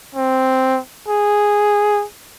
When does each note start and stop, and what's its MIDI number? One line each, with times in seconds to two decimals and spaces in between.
0.15 0.79 60
1.08 2.04 68